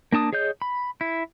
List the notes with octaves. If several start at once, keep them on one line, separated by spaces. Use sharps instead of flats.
A#3 D4 A5 D#6
G#4 C#5 D#5 G6
B5
E4